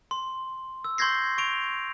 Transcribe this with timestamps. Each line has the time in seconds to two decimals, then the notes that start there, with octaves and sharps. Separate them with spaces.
0.11 C6
0.84 E6
0.98 C6 C#6 G6 G#6 A#6 C7
1.38 C#6 D7 F7